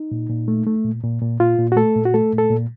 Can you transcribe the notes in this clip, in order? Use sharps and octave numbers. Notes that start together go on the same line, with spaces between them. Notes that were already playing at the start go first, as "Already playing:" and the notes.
Already playing: D#4
A#2
A#2
A3
A3
A#2
A#2
A#2
A#2 F4
A#2
F#4
A3 A4
A#2
F#4
A3 A4
A#2
A4
A#2